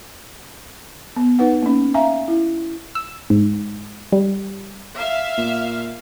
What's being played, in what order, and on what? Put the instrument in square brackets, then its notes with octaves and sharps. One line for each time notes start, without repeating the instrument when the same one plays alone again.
[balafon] B3
D#4 B4 F#5
A#3 C#4
E5 F5 G#5 A#5
E4
[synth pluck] E6
G#2
G3
[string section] E5 [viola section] F5
[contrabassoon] A#2